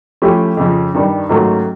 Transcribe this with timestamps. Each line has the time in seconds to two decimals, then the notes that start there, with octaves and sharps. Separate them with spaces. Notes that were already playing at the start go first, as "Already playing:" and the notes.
0.22 F3 A3 C#4 E4 G4
0.57 F2 C#3 F3
0.94 G2 D#3 G3
1.29 G#2 D#3 F#3 A3 C#4